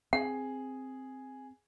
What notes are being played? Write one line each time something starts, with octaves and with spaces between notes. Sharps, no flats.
C4 G#4 F#5